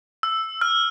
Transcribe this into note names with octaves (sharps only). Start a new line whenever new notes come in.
E6
F6